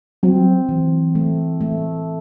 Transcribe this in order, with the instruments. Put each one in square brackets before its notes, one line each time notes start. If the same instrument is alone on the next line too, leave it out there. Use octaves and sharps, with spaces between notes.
[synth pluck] F#3 [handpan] C4
[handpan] E3
A3
A3